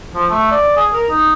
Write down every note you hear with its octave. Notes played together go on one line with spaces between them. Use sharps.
F3
A3
D5
G#4
A#4
D#4